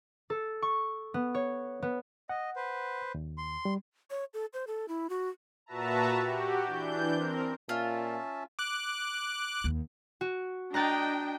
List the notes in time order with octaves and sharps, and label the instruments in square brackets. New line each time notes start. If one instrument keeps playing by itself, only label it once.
[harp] A4
C#6
B3
C#5
B3
[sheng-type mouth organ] D#5 [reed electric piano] F#5
[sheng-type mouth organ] B4 C5
[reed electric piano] D#2
[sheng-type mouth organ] C6
[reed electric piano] G3
[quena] C#5
A4
C5
A4
E4
F#4
[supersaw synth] A#2 F#4 B4 E5 A5 A#5
F#4 G4
E3 D4 G6
C4 A#4
[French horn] A#2 [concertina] C#4 E5 A5 [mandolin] F4
[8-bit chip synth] D6 F#6
[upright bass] D#2
[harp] F#4
[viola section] D4 D#5 G5 [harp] A#5 F#6 A6